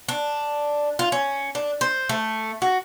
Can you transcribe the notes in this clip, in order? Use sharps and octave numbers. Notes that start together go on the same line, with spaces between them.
D4
F4
C#4
D4
C5
A3
F#4